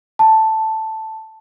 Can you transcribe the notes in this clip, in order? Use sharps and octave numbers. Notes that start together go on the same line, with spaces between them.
A5